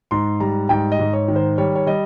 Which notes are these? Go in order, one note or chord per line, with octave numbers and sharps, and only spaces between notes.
G#2 C6
G3 A#5
G#2 G5
D#5
G#2
C#5
D#3
C5
G3 C#5
C#5
G3 D#5